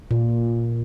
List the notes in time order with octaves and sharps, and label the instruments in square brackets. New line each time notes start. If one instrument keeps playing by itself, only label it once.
[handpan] A#2